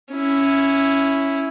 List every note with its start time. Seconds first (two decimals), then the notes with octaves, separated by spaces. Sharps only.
0.13 C#4 E4